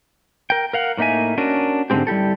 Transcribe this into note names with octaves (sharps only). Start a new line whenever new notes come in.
A#4 G5
A#4 F5 F#5
A2 A#3 D#4 E5 G#5
C#4 D4 F#4 A#4
G#2 D3 F3 G#3 C4 G4
G3 E4 G4 A4